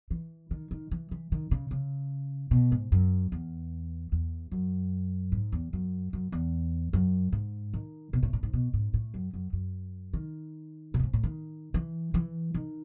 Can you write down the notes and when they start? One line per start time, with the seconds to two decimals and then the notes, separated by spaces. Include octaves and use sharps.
0.11 E3
0.51 D#3
0.71 D#3
0.91 E3
1.11 E3
1.32 D#3
1.51 C#3
1.71 C#3
2.51 B2
2.72 G#2
2.92 F#2
3.32 E2
4.12 E2
4.52 F#2
5.32 G#2
5.52 E2
5.73 F#2
6.13 F#2
6.32 E2
6.93 F#2
7.32 G#2
7.74 D#3
8.13 B2
8.23 A2
8.33 A2
8.43 G#2
8.53 B2
8.74 G#2
8.94 A2
9.14 F#2
9.33 F#2
9.53 F#2
10.13 D#3
10.94 B2
10.99 A2
11.03 G#2
11.13 A2
11.23 D#3
11.74 E3
12.14 E3
12.54 D#3